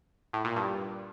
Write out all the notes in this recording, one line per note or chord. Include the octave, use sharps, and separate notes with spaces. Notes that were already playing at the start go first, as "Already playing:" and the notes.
A2
A#2
G2